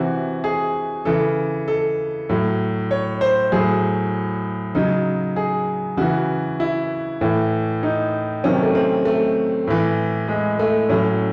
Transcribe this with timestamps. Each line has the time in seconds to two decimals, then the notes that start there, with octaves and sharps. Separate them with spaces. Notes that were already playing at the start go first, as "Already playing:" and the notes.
Already playing: C3 E3 F#4
0.44 G#4
1.05 C#3 E3 A4
1.68 A4
2.29 A2 F#3
2.91 C#5
3.21 C5
3.52 A2 F#3 G#4
4.75 C#3 F#3 D#4
5.36 G#4
5.97 C#3 E3 F#4
6.60 E4
7.21 A2 E3
7.83 D#4
8.44 C3 D#3 F#3 C#4
8.63 A3
8.75 C4
9.05 A3
9.67 A2 E3
10.28 G#3
10.59 A3
10.89 A2 F#3 C#4